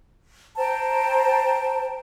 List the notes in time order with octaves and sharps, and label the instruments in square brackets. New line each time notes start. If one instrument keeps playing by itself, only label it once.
[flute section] C5 G5 A5 A#5